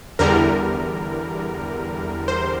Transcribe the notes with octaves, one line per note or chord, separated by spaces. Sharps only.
E2 D3 G3 A#4
C5